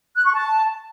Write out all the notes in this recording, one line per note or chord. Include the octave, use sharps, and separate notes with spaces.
F#6
C#6
A5